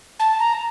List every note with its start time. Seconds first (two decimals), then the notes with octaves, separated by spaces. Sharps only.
0.20 A5
0.39 A#5